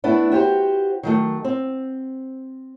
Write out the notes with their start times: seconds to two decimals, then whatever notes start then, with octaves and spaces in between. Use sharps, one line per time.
0.04 A3 B3 D4 E4
0.31 F#4 G4 B4 C5
1.03 D#3 F#3 A3
1.44 C4